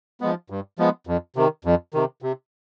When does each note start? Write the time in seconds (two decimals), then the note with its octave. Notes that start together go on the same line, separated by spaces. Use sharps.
0.21 F3 G#3 B3
0.50 G2
0.79 F3 G#3 B3
1.07 F2
1.36 C3 D#3
1.65 F2
1.94 C3 D#3
2.22 C3